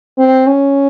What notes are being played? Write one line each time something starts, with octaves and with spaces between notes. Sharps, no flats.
C4
C#4